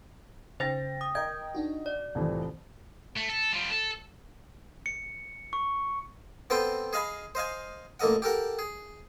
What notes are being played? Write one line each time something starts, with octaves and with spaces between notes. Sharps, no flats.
C#3 C5 G5 A6 A#6
D#6
A#4 D#5 G5 G#6
D4 D#4 F#4
D5
C2 F2 A2 E3
A3
A4
G3 F4
A4
C#7
C#6
B3 C4 A4 B4 C5 G5
G#4 D#5 F5 G#5 B5
C5 D#5 F5 G#5
A1 A#3 A4 D#5 F#5
G4 A4 A#4 F#5
G#4